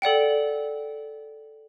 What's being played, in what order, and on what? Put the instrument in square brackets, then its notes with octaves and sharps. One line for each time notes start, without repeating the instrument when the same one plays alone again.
[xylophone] A4 D5 F#5 G5